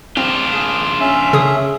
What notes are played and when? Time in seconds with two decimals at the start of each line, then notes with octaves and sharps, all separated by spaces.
0.17 C4 D4 F4
0.53 G#4
1.00 C#4 E5
1.33 C#3 G#4 D#6